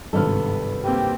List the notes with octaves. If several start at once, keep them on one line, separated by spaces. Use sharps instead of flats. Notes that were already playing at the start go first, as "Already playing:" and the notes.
G#1 G2 C3 B3 A4 F6
A#3 C4 G4